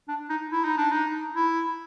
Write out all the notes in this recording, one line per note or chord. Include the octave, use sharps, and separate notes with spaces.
D4
D#4
E4
D#4
D4
D#4
E4